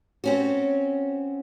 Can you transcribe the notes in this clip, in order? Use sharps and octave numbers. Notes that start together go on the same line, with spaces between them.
C4 C#4 F#4